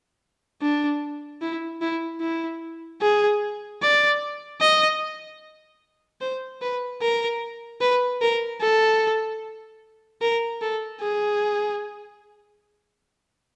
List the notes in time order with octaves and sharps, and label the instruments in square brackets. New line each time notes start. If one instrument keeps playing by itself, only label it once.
[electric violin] D4
E4
E4
E4
G#4
D5
D#5
C5
B4
A#4
B4
A#4
A4
A#4
A4
G#4